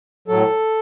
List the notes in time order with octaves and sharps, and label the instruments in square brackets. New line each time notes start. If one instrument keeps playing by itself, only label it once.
[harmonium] A2 F#3 A4